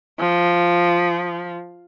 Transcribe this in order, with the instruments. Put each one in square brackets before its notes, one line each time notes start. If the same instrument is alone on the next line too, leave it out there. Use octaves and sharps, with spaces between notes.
[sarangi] F3